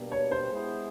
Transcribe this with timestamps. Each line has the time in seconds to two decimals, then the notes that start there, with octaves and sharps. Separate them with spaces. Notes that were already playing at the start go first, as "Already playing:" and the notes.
Already playing: B2 G3 A#3 D4 G4
0.12 C#5
0.31 C5
0.51 G#3 B3 E4 G#4